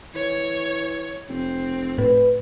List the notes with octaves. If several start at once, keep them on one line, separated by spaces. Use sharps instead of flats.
E3 C#5
F1 C4
A2 B4